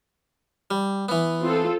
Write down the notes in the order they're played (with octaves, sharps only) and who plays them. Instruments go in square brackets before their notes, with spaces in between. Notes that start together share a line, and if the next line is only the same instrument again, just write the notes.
[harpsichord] G3
E3 B3
[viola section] C4 F4 A4